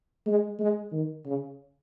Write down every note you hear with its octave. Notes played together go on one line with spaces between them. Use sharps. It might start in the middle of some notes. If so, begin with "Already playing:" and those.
G#3
G#3
D#3
C#3